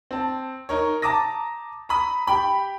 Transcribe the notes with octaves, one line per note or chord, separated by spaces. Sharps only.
C4 A5
D#4 A#4 C#5
A5 A#5 D6 D#6 A#6
A#5 B5 D#6
G4 G5 B5